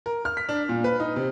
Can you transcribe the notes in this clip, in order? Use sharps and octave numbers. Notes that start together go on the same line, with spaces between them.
A#4
F6
B6
D4
A#2
B4
D#4
C3